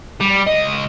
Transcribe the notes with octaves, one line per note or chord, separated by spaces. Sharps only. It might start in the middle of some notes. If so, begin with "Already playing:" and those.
G3
C#2 D#5